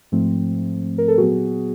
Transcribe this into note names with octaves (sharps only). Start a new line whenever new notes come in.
G#2 F3 A3 C4
A#4
A4
A#2 F#3 B3 F#4 G#4